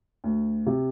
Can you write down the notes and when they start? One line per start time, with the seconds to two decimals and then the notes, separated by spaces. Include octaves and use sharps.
0.24 D2
0.66 C3